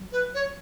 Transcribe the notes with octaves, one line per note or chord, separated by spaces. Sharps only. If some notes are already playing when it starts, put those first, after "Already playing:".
Already playing: F#3
B4
C#5